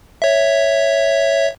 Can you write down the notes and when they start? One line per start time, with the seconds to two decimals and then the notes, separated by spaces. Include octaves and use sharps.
0.22 C#5 E5